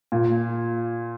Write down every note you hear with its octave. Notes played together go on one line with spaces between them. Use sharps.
A#2